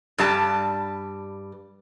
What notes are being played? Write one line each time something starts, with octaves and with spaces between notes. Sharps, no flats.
G2 G3 A5